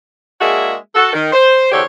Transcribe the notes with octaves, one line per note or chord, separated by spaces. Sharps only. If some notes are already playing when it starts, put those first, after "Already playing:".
G#3 A#3 D4 F#4 G#4 E5
F#4 A4
D#3
C5
E2 D3 G4 A4 C5 C#5